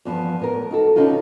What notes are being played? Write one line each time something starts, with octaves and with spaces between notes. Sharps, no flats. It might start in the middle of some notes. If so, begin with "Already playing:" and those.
E2 G2 F3 B3
A2 B3 A#4
D#4 F#4 A4
B2 D3 C#4 D#4 F4 F#4